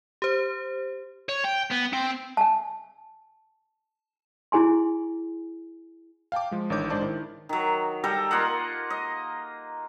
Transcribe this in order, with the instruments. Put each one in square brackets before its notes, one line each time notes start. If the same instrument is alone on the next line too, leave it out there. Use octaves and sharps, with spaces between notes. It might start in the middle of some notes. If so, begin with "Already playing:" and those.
[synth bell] G4 C5
[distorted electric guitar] C#5
G5
B3
C4
[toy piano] G#5 A5
E4 G#4 G#5 C6
[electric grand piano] F5 G5 A5 D6
F3 G#3
A1 D#3 D4 C#5 D6 G6
G#2 D4 C5 D5 A5 D6
D#3 E4
[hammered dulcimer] D#3 F#3
G3 A4 G5 A#5
A#3 F4 D#5 F#5
D#5